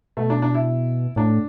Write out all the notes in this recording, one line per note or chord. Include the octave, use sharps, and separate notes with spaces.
B2 A3
D4
D4
E4
A2 D4